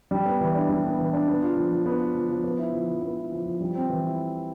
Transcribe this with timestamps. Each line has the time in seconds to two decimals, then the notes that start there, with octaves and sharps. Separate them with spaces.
0.11 G3
0.26 B3
0.41 E3
0.55 D4
0.69 G3
0.84 B3
0.99 E3
1.13 D4
1.28 B3
1.42 F4
1.57 F3
1.72 F3
1.86 B3
2.00 F4
2.15 F3
2.29 F3
2.44 B3
2.59 E4
2.73 F3
2.88 F3
3.02 B3
3.17 E4
3.32 F3
3.46 F3
3.61 G3
3.75 C4
3.89 E3
4.04 E4